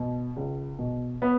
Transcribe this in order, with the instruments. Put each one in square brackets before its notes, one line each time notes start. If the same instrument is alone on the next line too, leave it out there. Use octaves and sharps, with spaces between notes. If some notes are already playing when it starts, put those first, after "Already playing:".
Already playing: [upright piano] B2
C#2
B2
B3